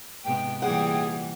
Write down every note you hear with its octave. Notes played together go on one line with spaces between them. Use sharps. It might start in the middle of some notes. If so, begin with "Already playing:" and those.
G#2 C3 B3 G5
A#2 E3 G3 G#4 F#5